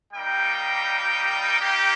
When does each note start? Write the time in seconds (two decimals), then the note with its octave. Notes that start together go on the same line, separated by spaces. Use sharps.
0.12 G3 A#3 D#4 G4 G5
1.59 A#3 D#4 G4